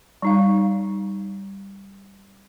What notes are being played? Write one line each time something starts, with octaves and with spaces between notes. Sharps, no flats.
G3 D#4 F5